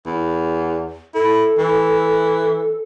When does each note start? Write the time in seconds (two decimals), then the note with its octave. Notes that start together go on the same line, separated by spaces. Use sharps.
0.06 E2
1.15 E4 A4
1.58 E3